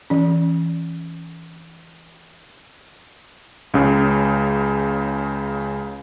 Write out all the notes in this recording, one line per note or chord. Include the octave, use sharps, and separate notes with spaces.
E3 C#4
C#2 C#3